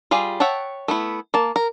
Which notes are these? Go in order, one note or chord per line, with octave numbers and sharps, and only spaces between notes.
G3 F4 G#4 F5
C#5 E5 F#5 G5 A5
A3 B3 E4
A#3 A5
A#4